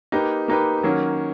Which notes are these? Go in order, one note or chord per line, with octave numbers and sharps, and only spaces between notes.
A#3 D#4 G4 B4
A#3 D#4 G4 B4
D#3 F#3 A#3 C#4